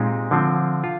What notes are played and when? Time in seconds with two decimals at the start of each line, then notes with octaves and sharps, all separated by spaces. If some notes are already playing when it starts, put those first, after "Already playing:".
Already playing: A#2 G#3 C4 D#4 G4
0.31 D3 F3 C4
0.84 F4